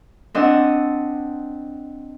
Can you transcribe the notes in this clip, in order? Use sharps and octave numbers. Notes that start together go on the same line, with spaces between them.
C4 D4 D#5 F#5